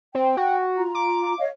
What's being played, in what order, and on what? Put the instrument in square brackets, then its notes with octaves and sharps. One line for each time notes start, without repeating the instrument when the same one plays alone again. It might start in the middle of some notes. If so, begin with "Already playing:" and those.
[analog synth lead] C4 [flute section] G5
[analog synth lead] F#4
[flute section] F4 A#5
[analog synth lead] D6
[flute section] C#5 D#5 F5